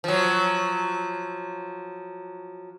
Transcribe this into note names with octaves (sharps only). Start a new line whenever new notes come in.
F3 F#3